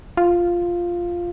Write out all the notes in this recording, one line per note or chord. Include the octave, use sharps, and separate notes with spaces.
F4